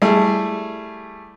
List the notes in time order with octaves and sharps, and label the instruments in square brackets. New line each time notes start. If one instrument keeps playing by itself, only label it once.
[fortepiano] G3 A3 E4 G#4